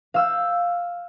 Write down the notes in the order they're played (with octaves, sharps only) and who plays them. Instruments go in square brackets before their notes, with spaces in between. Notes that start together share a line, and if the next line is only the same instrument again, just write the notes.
[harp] F5 E6 G6